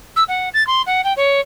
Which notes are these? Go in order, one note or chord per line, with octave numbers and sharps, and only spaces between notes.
E6
F#5
A6
C6
F#5
G5
C#5